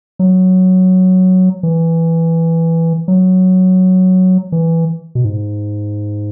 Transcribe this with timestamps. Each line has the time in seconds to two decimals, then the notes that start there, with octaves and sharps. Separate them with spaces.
0.19 F#3
1.63 E3
3.08 F#3
4.52 E3
5.15 B2
5.25 G#2